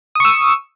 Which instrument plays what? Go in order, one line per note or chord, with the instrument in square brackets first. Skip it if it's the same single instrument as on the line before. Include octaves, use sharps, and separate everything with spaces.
[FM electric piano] D#6
C#6
E6